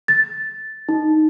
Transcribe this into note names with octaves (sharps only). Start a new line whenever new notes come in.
A6
D#4